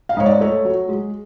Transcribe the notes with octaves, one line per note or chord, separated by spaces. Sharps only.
F5
G#2 C#5
D5
A3 C#5
F#3
G#3